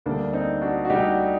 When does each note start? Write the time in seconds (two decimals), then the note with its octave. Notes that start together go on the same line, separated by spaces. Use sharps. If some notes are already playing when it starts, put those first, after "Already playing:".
0.06 D2 D3 G3 A#3 D4
0.33 C4 D#4
0.61 D4 F#4
0.85 F#4
0.89 D2 D3 G3 D#4 G4